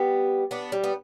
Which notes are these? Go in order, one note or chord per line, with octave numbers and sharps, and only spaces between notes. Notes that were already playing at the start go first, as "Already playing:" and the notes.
Already playing: G3 B3
B3 D4
G3
B3